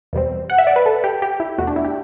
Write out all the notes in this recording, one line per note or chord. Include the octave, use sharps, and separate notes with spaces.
E2 B2 G3 C4
F#5
E5
D5
B4
A4
G4
G4
E4
E2 B2 A3 F#4
D4
E4
G4